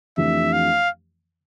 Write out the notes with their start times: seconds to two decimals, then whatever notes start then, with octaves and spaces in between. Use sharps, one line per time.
0.17 F2 E3 A3 D4 G4 E5
0.52 F5